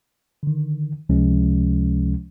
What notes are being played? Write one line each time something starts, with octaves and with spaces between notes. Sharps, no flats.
D3 D#3
C#2 C3 F3 G#3 C#4